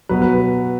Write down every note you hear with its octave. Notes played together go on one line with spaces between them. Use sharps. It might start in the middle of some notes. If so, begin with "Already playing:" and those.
B2 F#3 B4
B4